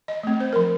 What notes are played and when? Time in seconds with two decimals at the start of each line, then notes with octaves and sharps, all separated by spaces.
0.08 D#5
0.23 A3 C4
0.40 C5
0.53 F3 A#4